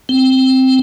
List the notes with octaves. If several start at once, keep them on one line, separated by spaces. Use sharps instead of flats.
C4